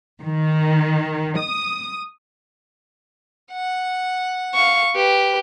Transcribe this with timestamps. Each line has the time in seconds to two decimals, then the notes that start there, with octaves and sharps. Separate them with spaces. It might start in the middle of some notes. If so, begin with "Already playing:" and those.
0.21 D#3
1.39 D#6
3.52 F#5
4.55 F5 C#6
4.95 G4 B4